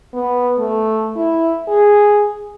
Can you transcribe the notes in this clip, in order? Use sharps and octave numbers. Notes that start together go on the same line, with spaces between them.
B3
A3
E4
G#4